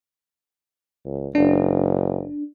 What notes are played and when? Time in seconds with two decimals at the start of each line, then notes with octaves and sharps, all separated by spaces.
1.05 C#2
1.35 F#1 D4